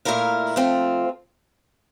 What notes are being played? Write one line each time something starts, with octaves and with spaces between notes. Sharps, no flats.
A#2 A3 E4 A#4 F5
F3 A3 C4 F4